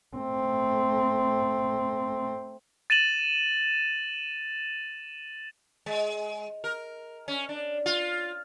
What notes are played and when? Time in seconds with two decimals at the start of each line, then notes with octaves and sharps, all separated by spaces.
0.17 A3 C4
2.90 A6 D#7 E7 F#7
5.86 G#3
6.64 A#4
7.28 C#4
7.49 D4
7.86 F4